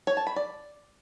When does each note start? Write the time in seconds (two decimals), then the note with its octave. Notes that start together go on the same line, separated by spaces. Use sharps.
0.07 C#5
0.17 A5
0.27 B5
0.36 D5